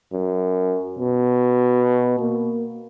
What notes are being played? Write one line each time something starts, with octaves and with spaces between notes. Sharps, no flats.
F#2
B2
A#3